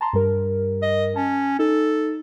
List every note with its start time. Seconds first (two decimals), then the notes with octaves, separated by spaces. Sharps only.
0.01 A5 A#5 C6
0.13 G2 G3 A#4
0.82 D#5
1.16 C#4 A5
1.59 D#4 A4